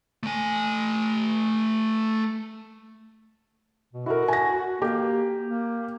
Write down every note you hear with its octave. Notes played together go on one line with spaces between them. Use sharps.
A3 G#5
B2
E4 F#4 A#4
G#5 A#6
A#3 G4
A#3